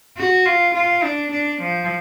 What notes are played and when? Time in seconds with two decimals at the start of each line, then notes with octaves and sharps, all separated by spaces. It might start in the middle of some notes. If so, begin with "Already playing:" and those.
0.17 F#4
0.45 F4
0.75 F4
1.03 D4
1.32 D4
1.62 F3